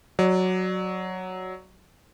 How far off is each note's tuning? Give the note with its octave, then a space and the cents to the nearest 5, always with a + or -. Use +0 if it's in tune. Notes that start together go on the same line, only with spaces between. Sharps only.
F#3 +0 D5 +20